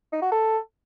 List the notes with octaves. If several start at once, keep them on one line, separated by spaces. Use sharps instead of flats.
D#4
F#4
A4